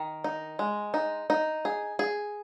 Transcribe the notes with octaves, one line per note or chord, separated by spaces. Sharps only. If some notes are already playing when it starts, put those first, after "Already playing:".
Already playing: D#3
D#4
G#3
D#4
D#4
G#4
G#4